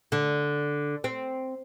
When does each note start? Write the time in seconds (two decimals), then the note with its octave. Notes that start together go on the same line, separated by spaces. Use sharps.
0.12 D3
1.04 C4